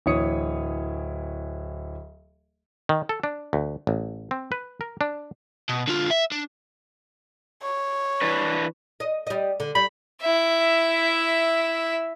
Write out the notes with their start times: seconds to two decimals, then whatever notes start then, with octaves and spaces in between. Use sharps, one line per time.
0.06 D1 E3 C#5 D#6 C#7
2.89 D#3
3.09 A4
3.24 D4
3.53 D2
3.87 A1
4.31 C4
4.52 B4
4.81 A#4
5.01 D4
5.69 B2
5.88 D3 F4
6.11 E5
6.32 D4
7.62 C#5
8.22 E3 D4 B4
9.00 D#5
9.27 G3 D#5
9.60 D3
9.75 G3 B5
10.22 E4 E5